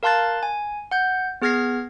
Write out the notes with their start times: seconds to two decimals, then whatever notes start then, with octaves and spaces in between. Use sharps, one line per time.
0.03 A#4 F5 A5 C6 F#6 A6
0.43 G#5
0.91 F#5 G6
1.42 B3 G#4 F6 G#6 A#6 C7